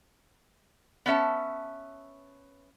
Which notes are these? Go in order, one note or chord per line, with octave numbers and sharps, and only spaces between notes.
B3 C#4 E5 A5